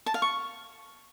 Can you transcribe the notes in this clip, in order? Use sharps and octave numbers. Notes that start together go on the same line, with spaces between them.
A5
F5
C#6